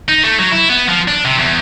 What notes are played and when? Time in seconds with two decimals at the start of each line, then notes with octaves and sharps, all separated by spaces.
0.09 D#4
0.23 A3
0.39 F#3
0.51 E4
0.69 B3
0.88 F3
1.08 D4
1.25 C3
1.39 E2